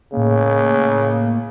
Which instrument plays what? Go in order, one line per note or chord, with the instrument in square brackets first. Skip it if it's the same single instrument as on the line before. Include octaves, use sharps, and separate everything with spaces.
[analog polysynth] A2 A#3 [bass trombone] C#3